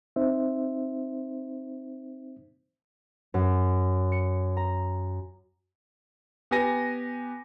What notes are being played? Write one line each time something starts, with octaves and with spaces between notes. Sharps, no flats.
C4 D#4 C5 E5
F#2
C#7
A#5
B3 G4 B4 G#5 A#6 D#7